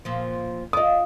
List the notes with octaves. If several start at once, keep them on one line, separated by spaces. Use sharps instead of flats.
A#2 F3
F4 D5 D#5 D#6